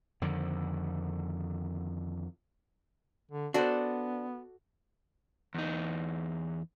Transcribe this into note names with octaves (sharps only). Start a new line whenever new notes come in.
F2 D3 D#3
D3
B3 D4 F#4 A4 C5 D5
E2 D#4